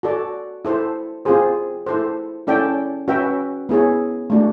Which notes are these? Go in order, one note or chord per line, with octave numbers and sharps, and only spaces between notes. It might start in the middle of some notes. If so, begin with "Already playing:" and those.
F#4 A4 D5
E4 A4 C5
C4 F4 G#4 C5
E4 A4 C5
C#4 E4 A4 D5 G5
C#4 F#4 B4 E5 G5
B3 E4 G#4 C#5
A3 D4 F#4